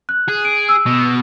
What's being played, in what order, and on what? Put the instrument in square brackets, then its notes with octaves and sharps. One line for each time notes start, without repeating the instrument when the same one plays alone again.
[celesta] F#6
[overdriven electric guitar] G#4
[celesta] D7
E6
[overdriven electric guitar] B2